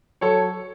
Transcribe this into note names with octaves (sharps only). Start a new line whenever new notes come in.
F#3 A4 C#5